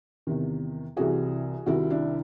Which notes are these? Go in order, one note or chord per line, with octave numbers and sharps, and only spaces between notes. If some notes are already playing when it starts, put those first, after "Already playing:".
E2 C3 D#3
C2 C3 E3 F#4 G#4
C2 C3 D#3 E4 F#4
D4 E4